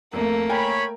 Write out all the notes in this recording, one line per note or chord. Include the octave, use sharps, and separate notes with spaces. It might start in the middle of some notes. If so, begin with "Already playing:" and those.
F2 A3 A#3
A#4 C#5 G5 G#5 B5